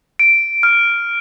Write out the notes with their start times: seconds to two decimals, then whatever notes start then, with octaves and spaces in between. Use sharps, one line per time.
0.19 D7
0.63 F6